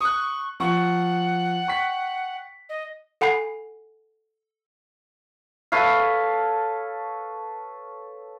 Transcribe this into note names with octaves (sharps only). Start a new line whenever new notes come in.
C#6 D#6 F#6
F3 F#5 C#6
G5 C#6 B6
D#5
A4 F#5 G#5 B5 C7
A4 B4 C#5 F5